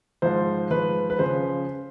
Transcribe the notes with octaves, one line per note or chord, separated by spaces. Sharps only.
G#2 F3 C5
G#2 F3 B4
B4
C#3 F3 C5